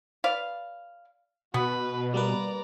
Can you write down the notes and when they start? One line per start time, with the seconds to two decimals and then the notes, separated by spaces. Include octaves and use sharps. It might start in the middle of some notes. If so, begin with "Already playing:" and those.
0.24 B4 D5 F5
1.54 B2 B3 F#4 B4
2.14 G3 A#3 B4 D5 A#5